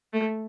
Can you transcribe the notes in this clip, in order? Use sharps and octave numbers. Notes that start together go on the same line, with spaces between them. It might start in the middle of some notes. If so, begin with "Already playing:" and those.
A3